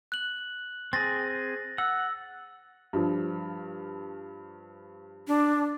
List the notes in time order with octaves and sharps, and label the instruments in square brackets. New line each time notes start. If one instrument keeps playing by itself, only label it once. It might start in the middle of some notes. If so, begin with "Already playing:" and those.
[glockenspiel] F#6 F#7
[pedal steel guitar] C4 G#4 [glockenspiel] A6 A#6
[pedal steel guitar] F#5 [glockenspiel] E6
[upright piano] G2 F3
[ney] D4